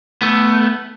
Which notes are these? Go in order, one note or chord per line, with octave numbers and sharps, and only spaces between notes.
A3 B3